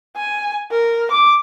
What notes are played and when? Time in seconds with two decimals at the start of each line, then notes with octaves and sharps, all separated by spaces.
0.17 G#5
0.71 A#4
1.11 D6